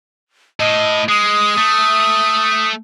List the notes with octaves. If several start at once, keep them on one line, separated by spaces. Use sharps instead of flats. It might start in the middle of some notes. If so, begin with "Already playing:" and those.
A2 D#5
G#3 D#6
A3